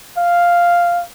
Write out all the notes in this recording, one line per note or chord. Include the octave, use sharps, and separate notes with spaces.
F5